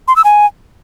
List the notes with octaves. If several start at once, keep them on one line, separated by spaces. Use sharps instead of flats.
C6
E6
G#5